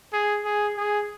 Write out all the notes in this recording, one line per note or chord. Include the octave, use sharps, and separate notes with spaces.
G#4
G#4
G#4